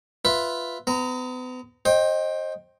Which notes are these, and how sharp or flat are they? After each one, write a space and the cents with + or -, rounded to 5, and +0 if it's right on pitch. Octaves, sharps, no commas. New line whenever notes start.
F4 +0 B4 +0 E5 +0
B3 +40 A#5 -10
C5 +30 D#5 +0 G5 +0